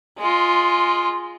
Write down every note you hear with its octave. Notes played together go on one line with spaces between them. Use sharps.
G#3 F4